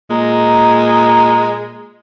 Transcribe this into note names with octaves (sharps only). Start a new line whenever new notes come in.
A#2 G#3 A#5